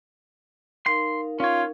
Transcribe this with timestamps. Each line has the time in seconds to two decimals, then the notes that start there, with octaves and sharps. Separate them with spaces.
0.86 D#4 A#4 F5 C6
1.40 C#4 F4 C#5